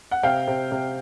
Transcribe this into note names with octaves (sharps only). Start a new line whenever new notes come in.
F#5
C3 F5 G5
C3
C3